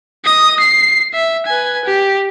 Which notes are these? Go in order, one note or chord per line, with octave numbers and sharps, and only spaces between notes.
D#5 D#6
C7
E5
B4 G#5
G4